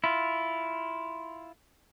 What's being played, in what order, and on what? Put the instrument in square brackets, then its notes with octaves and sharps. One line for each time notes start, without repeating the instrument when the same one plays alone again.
[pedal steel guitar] E4 F4